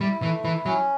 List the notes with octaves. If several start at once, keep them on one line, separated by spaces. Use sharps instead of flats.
G3 E4
E3 A3
E3 E4
F#3 C#4